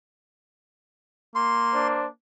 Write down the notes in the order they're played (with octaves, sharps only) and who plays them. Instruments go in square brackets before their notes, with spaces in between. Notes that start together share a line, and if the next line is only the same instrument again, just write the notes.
[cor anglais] A#3 [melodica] C6
[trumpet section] D4 C5